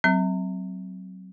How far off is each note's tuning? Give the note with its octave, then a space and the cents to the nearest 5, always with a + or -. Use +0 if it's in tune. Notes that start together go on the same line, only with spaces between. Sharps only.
F#3 +20 C4 -10